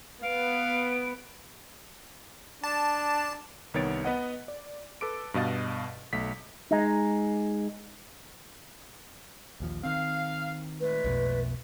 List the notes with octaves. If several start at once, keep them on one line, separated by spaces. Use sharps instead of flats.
B3 F5 D7
D4 A5
C2 D#3 B3 C#5 A6 D7
B3 B4 D#5 F#5
D5
A4 B4 D6 D7
G2 B2 D#5 F5 A6
B1 A3 B6
G#3 D#4
A#1 D#2 F3
D#3 C4 F5
A#2 G#3 A3 B4
B1 F2 B2